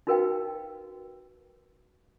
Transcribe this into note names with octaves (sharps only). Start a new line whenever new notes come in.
D#4 F#4 A#4 B4 F5 G5